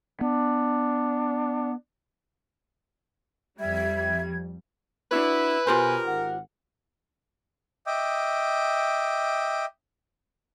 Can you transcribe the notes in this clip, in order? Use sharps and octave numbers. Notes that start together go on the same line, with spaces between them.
B3 D4
F2 G3 E5 G#6
D4 E4 F#4 B4 C#5
B2 F4 G4 A#4 C5 G#5
G#1 F#5
D#5 E5 G5 D6